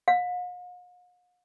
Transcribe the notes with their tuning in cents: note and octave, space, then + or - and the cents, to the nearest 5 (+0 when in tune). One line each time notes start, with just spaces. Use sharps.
F5 +45